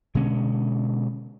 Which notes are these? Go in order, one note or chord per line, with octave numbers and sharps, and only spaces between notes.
B2 D3 G#3 C#4